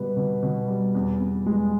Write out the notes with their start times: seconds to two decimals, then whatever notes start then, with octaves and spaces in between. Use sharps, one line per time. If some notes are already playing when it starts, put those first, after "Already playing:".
Already playing: B2 G3 B3 B4
0.17 B2
0.43 B2
0.68 G3
0.95 E2
1.20 E2
1.46 G#3